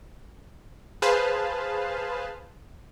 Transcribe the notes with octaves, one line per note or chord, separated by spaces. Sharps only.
G#4 B4 C5 F5 A5